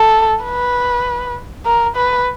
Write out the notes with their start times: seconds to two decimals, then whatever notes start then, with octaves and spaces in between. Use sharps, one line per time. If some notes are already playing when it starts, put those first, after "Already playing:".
Already playing: A4
0.44 B4
1.65 A#4
1.96 B4